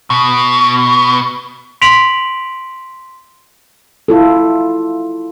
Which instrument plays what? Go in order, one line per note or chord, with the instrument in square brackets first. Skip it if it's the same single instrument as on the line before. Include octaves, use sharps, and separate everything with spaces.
[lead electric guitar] B2
[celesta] C6 B6 D7 F7 F#7
[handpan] E4 F4 A4